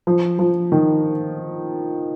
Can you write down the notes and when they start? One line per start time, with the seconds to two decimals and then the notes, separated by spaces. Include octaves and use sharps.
0.07 F3
0.39 F3
0.72 D#3